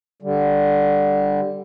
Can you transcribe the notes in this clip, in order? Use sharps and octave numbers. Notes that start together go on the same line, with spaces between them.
D3 G3